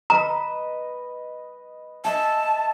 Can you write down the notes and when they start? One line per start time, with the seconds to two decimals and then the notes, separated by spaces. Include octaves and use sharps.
0.10 B4 D#5 A#5 B5
2.04 D#5 E5 G#5 A5